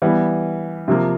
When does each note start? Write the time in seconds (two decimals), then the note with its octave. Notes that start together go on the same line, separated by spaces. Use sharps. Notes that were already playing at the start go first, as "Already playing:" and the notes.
0.02 E3 G3 B3
0.88 C3 F3 A#3